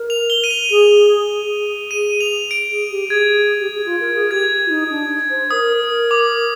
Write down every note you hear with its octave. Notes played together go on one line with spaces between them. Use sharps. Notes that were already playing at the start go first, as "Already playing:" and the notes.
Already playing: A#4
F7
G7
D#7
F7
G#4 F7
G#4
G#4 D#7
F7
D7
G#4
G4
G#4 G#6
G4
G#4
F4
A#4
G#4
G4 G#6
F4
D#4
D4
C5
A#4 D#6
A#4
D6